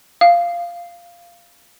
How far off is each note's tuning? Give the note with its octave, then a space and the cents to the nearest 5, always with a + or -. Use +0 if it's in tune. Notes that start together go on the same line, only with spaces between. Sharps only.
F5 -10